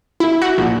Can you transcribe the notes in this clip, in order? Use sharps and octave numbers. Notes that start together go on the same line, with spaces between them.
E4
F#4
A#1